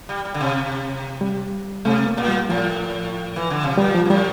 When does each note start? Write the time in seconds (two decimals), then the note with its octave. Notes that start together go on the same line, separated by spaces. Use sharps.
0.09 G3
0.25 G3
0.34 D3
0.41 C3
1.21 G3
1.85 C3 A3
2.07 A#3
2.17 A#2
2.28 G3
2.49 A2 F3
3.36 E3
3.50 D3
3.64 C3
3.77 A#2 G3
3.94 F3
4.05 G2
4.10 A2 G3